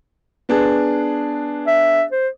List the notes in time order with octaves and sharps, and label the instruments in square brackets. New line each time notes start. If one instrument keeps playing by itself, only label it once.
[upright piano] B3 D4 G#4
[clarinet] E5
C5